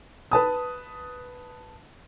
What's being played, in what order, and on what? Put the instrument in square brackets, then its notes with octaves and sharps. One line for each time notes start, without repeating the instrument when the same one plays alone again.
[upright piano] B4 A5 D#6